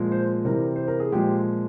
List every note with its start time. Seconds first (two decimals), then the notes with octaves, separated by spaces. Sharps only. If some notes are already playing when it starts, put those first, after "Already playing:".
Already playing: A#2 F3 G#3
0.12 C5
0.45 C3 E3 G3 A#4
0.76 C5
0.88 A#4
1.00 G#4
1.12 A#2 F3 G#3 G4